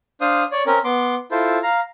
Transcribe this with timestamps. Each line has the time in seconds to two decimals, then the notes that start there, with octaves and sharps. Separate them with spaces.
0.21 D4 C5 F5 D#6
0.52 C#5 D5
0.66 C4 C#4 A#4
0.85 B3 C6 D6
1.31 E4 F4 A4 C5
1.63 F5 A#5